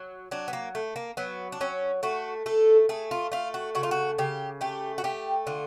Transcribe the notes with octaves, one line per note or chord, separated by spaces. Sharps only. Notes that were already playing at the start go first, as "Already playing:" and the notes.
Already playing: F#3
F#3 D4
B3
A#3
A3
A#3
F#3 B3
D4
F#3 C#4
A3 F#4
A3 A4
A3 G#4
F4
A3 F4
F#4
C#3 F#4
F4
F#4
C#3 G4
A3 G4
F#4
A3 G4
D3 F4